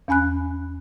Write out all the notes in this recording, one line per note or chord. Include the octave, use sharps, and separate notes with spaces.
E2 C#4 G#5 B5 F#6